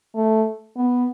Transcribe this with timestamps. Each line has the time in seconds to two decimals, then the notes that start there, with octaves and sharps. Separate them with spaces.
0.15 A3
0.76 B3